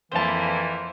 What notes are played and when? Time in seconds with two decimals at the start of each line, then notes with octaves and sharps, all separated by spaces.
0.12 F2 E3 A#3 E4 C5 A5